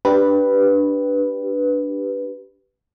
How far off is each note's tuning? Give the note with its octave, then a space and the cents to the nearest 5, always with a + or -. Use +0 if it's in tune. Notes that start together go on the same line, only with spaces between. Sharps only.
D4 +0 G4 -10 B4 +0